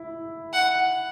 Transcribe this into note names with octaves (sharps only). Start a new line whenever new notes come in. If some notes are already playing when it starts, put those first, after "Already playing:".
Already playing: E4
F#5